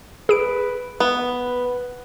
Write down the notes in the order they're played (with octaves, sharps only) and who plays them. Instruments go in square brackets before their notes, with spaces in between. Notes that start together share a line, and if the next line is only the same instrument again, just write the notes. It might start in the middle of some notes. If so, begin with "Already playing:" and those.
[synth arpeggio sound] G#4 D7 [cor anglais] B4
[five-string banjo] B3 [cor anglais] B4